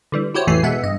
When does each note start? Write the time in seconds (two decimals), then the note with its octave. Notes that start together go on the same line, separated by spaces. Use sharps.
0.12 D3 E3 G3
0.34 E4 F#4 G4 C5 C#5
0.47 A1 F2 E3 A3 G#5 C7
0.63 B2 G#3 B3 E5 F#5
0.83 G2 D#5